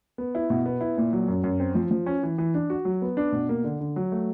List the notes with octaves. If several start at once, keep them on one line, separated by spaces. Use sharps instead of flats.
B3
E4
B2
B3
E4
A#2
F#3
F#2
F#2
C4
F3
F3
C#4
E3
E3
D4
F#4
F#3
B3
D4
B2
A#3
D3
D3
F#3
A3